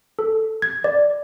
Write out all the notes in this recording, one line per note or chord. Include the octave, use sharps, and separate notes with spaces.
A4
G#6
D5